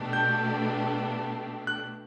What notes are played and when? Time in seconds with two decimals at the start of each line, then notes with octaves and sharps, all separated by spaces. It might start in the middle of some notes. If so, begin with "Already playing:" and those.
Already playing: B2 A3 D4 G4
0.13 G6
1.67 F#6